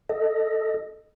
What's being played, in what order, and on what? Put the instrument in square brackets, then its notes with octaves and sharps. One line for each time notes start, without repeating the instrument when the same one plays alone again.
[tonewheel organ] A4 D#5